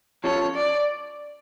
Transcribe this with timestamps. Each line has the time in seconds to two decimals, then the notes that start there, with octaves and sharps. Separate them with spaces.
0.24 F3 C#4 F4 A4 C#5
0.55 D5